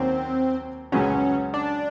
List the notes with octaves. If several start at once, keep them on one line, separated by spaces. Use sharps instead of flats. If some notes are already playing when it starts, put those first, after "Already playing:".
Already playing: D#2 F#3 C4 C#4
C#2 C#3 F#3 B3 C#4
D4